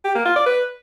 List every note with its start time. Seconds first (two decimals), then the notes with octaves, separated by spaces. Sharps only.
0.05 G4
0.15 A#3
0.25 F4
0.36 D5
0.46 B4